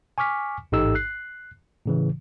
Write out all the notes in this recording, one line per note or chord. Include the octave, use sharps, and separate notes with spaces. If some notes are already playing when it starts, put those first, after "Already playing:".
G#5 C#6 D6 F6 B6
A1 G#2 D#4 G4 A4 E6
F#6 C7
A2 C#3 E3